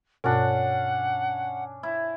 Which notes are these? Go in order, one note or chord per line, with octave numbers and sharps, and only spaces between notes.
G2 B2 C#4 D4 F#5
E4